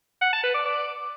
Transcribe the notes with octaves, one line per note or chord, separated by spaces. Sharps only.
F#5
A5
B4
D5
D5